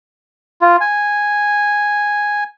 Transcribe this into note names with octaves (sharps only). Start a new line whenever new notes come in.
F4
G#5